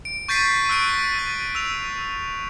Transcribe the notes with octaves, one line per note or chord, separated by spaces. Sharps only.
D7
C#6 G6 A6 B6 C7 D#7
E6 F#6 D7 D#7
B6
A6
E6 F7